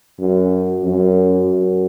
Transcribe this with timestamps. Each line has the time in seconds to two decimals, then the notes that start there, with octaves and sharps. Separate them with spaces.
0.20 F#2
0.83 F#2
1.46 F#2